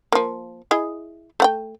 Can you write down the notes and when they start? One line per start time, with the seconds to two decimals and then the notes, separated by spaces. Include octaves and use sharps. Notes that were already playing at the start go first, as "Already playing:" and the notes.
0.12 F3 A#3
0.71 E4 G#4 D#5
1.40 A3 F#5 G5